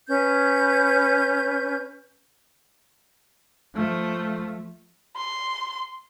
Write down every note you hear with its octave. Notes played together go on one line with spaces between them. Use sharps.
C#4 B4 G6 G#6
F3 A3
C6